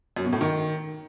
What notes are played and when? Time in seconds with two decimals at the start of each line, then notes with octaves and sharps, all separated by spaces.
0.16 F#2
0.25 B2
0.33 A2
0.41 D#3